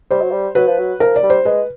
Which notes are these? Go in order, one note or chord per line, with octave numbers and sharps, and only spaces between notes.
G3 C5
F#3
G3
F#3 B4
F3
F#3
F3 A#4
D5
G3
C5
G#3 B4